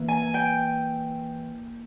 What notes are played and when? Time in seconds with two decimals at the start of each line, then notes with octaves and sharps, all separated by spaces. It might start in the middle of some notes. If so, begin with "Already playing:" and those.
Already playing: E3 A#3
0.08 G#5
0.34 G5